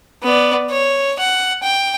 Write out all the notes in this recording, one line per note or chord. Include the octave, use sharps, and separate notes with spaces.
B3 D5
C#5
F#5
G5